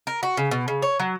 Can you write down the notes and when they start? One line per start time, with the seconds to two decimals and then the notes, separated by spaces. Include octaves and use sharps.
0.07 A#4
0.23 F#4
0.37 C#3
0.51 B2
0.68 C#3
0.82 C#5
1.00 F#3